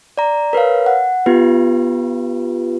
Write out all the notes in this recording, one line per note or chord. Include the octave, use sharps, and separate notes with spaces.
D5 A#5
A#4 B4 C#5 F5
F#5
B3 F4 G4 B4